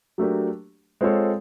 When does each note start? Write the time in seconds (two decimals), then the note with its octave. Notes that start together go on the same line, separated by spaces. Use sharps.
0.18 F#3 A3 D4 G4 A#4
1.01 G#3 C4 F4 A4 C#5